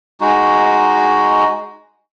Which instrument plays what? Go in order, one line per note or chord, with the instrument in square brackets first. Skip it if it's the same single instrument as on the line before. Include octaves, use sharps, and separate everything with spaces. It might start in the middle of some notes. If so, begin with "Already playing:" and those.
[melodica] G#3 D#4 F#4